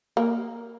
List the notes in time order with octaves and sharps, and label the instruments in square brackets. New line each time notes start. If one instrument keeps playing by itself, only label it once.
[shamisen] A#3